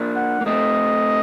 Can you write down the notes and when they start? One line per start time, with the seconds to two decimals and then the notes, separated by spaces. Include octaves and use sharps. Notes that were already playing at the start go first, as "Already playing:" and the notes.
Already playing: A#3 D4
0.16 F#5
0.41 A#3
0.46 A3 C4 D#5